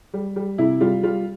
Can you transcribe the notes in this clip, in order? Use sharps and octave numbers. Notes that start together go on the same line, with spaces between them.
G3
G3
C3 E4
G3 F4
G3 F4